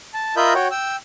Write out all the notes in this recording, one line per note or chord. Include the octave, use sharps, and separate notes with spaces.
A5
F4 A#4 D#5 E5 B5 G6
F#4 C#5 G5
G5 E6